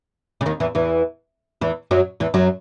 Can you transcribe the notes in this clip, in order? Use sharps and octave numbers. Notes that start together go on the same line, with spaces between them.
C#3
D#2 D#3
E2 E3
E2 E3
E2 E3
F#2 F#3
E2 E3
F#2 F#3